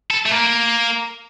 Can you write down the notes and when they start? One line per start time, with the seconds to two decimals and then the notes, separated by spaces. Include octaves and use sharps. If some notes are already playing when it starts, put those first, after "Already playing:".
0.10 A4
0.26 A3
0.31 A#3